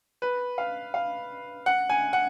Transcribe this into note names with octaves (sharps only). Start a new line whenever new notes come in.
B4
F5
F5
F#5
G#5
F#5